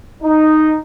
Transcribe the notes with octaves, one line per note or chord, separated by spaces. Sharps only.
D#4